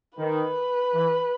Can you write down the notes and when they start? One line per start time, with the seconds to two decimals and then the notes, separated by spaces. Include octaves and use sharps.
0.18 D#3 B4
0.93 E3